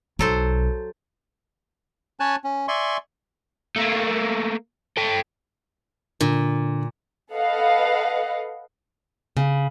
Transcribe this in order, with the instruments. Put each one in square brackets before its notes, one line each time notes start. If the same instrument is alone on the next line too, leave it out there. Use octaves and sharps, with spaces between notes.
[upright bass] B1 [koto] F#3 A4 C5
[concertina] C#4 C#5 G#5 A5 F#6
C#4
D5 E5 G#5 C6 C#6
[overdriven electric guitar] A3 A#3
A4 G5
[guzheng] A#2 [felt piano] D3
[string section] A4 B4 D#5 F5 F#5
[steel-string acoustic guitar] C#3